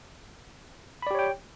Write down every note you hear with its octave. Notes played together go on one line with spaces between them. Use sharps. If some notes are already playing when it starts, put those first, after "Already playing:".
G4 C#5 D5 G5 B5